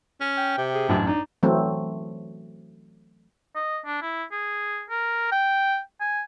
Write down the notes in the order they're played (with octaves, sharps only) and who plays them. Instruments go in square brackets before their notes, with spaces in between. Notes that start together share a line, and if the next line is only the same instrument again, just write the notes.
[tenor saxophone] C#4
[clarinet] G5
[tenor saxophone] C3
[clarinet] G#4
[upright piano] A1 F#2 [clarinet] D4
[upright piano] D4 [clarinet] D#4
[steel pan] E3 F#3 A3 C4
[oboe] D#5
D4
E4
G#4
A#4
G5
G#5